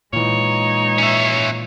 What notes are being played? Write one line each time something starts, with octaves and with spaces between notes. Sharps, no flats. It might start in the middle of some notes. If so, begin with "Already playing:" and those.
A#2 E3 G#3 D#4 C#5
C#4 E5